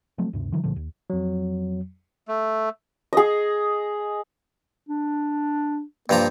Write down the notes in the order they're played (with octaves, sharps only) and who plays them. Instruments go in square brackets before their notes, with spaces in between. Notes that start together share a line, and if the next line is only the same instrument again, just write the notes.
[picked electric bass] F3 F#3 A3 C4
D2 G2 C3
D3 E3 F#3
C2 A#2 D3 F3
D#2
[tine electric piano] F2 F#3
[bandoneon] A3
[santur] G#4 D#5
[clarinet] D4
[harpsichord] G2 F3 A#5 [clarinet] A#3